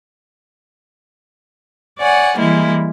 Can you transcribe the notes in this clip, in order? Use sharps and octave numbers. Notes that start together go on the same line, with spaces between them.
C#5 D5 F#5 G#5
E3 G3 G#3 A#3 E4